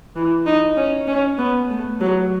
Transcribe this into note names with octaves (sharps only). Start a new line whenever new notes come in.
E3
D#4
C#4
C#4
B3
A3
F#3